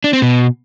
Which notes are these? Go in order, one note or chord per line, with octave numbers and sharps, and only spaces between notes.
D4
C4
B2